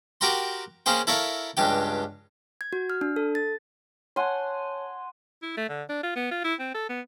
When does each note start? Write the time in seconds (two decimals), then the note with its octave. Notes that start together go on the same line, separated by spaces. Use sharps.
0.21 F#4 G4 A#4 G5 A#5 C6
0.86 A#3 C#4 G#4 C5 G5
1.07 E4 A4 A#4 C#5 E5 F5
1.57 C#2 G2 G4 G5
2.61 G#6
2.73 F#4
2.90 F6
3.01 D4
3.16 A4
3.35 A6
4.16 C#5 F#5 G#5 A5 C6
5.43 E4
5.57 A3
5.69 D3
5.89 D4
6.03 F4
6.16 B3
6.31 F4
6.45 E4
6.60 C4
6.74 A4
6.89 B3